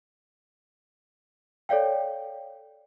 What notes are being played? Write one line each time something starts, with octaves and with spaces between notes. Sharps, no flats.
A4 C#5 D5 F5 G5